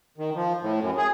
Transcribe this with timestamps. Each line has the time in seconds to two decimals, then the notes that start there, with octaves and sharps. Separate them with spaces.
0.18 D#3
0.35 F3
0.62 A2
0.81 F#2
0.97 G#4